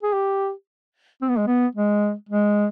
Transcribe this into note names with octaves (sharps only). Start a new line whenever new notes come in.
G#4
G4
C4
B3
G#3
B3
G#3
G#3